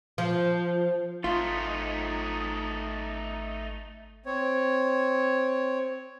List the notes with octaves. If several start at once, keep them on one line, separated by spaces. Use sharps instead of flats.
F3
G#1 A3 D#4 F4
C4 C#5